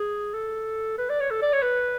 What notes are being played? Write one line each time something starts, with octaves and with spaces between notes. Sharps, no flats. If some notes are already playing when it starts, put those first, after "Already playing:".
Already playing: G#4
A4
B4
D5
C#5
A4
D5
C#5
B4